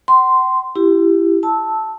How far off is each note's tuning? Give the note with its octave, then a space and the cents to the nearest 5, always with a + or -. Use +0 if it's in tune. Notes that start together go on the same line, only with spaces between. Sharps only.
F#5 +40 C6 -10
E4 +20 G4 +0
A5 +0 E6 -15